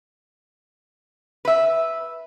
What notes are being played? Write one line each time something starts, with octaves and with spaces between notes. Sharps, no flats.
B4 E5